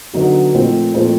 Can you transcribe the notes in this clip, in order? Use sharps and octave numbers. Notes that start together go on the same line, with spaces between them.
D3 F#3 B3 D#4 F#4
A#2 F3 A3 C4
A#2 F3 A3 C4